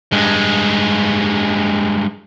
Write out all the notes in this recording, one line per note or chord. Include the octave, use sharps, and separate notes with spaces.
G2 G#3